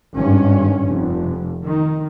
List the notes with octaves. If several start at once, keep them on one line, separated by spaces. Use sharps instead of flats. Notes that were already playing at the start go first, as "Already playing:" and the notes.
G#1 G2 C#4
F1
D#3